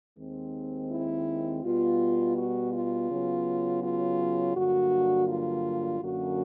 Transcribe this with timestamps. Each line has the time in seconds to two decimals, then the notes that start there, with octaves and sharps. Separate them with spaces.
0.18 D#2 D#3 G#3 C4
0.91 E4
1.63 B2 G3 B3 F4
2.36 F#4
2.72 F4
3.09 C#3 F#3 B3
3.81 F4
4.54 G2 D3 F#3 A#3 F#4
5.27 F4
5.99 F#2 D3 F#3 A#3 C#4 F#4